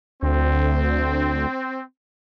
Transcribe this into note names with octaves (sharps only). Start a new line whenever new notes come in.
D2 C4